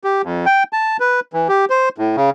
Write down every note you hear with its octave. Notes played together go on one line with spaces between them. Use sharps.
G4
F2
G5
A5
B4
E3
G4
C5
A2
C#3